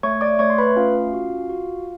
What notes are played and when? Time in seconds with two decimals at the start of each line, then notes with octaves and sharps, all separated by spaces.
0.03 A3 C#5 C#6
0.21 D5 D6
0.39 A3 C#5 C#6
0.50 C6
0.58 B4 B5
0.76 C#4 F4 F5
1.13 F#4
1.50 F#4